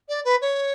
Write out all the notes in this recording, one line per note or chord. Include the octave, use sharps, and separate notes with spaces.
D5
B4
C#5